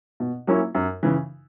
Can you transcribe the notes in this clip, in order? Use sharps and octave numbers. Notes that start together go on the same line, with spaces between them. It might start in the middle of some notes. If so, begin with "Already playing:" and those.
B2
F#3 A#3 C#4 E4
F#2
C#3 E3